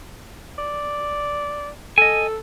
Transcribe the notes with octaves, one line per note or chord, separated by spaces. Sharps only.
D5
A4 D#5 G#5